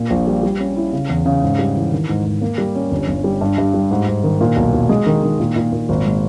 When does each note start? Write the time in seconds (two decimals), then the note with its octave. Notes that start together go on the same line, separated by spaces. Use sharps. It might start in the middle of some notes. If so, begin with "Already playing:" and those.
Already playing: A#2
0.10 A#1
0.27 G3
0.43 G3
0.60 C#4
0.77 E4
0.93 C#3
1.09 E2
1.26 C#3
1.43 G#2
1.59 G3
1.76 E3
1.92 D#3
2.09 G#2
2.25 G#2
2.41 A#3
2.58 G3
2.75 C#4
2.91 G1
3.08 G1
3.24 G3
3.41 G2
3.58 G2
3.74 G3
3.91 G#2
4.07 G#2
4.24 D#3
4.41 A#2
4.56 B1
4.74 B1
4.89 G#3
5.06 D#3
5.23 D#3
5.40 A#2
5.56 A#2
5.72 A#2
5.89 G#1
6.06 G#3